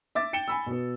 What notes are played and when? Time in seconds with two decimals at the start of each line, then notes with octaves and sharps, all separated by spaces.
0.15 E5 D6 A6
0.33 G5 C#7 E7 G7
0.48 G#5 B5 E6
0.66 B2 B3